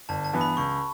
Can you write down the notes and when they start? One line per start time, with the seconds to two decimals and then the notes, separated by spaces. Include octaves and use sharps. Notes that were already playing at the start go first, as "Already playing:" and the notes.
0.09 G1 A5
0.25 A5
0.33 G2 E3 B3
0.41 B5
0.57 C#2 C#6